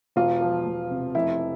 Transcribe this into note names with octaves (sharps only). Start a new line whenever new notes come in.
E1 F4
F3
E1
C3
F1 E4